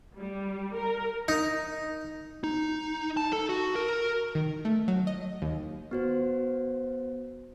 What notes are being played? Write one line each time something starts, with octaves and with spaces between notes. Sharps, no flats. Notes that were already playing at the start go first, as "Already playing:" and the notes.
G3
A#4
D#4
D#4
A5
A4
F#4
A#4
D#3
A3
F#3
D#5
D#2
B3 F#4 C5